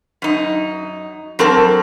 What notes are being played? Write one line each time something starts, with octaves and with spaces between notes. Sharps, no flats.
F#2 D#4
F#3 C4 A4 A#4 A5